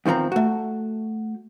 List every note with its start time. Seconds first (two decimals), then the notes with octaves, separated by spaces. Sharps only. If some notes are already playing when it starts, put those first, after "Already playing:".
0.06 E2 D#3 F3 C4 A#5
0.32 A3 F#4